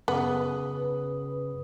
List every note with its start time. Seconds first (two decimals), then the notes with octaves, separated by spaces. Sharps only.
0.08 F#2 C#3 B3 B4 D#6